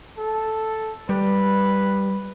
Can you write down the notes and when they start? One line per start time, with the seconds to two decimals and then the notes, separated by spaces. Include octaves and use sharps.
0.18 A4
1.09 G3 B4